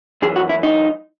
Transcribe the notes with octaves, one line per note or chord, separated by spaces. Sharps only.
F#2 E3 G#4
F#4
E4
D#4